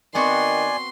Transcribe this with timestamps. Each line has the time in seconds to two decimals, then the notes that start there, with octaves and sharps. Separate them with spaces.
0.15 D#3 B3 C4 F#4 D5 G#5 C6